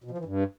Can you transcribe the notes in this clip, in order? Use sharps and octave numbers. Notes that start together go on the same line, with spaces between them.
B2
F3
E3
G2